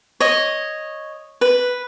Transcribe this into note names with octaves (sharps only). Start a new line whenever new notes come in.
C#5 D#5
B4